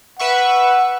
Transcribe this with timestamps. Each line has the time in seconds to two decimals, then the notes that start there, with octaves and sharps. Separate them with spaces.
0.19 B4 E5 F#5 C#6